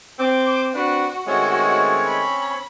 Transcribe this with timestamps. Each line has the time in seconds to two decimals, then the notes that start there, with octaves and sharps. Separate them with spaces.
0.19 C4 D6
0.75 C4 D4 F#4 B4
1.27 D#3 G#3 A3 C4 C#4 F#4 C#5
2.07 B5